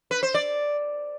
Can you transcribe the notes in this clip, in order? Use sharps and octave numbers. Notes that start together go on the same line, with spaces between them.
B4
C5
D5